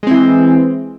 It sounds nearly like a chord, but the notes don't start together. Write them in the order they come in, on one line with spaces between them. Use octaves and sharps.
G#3 C4 E3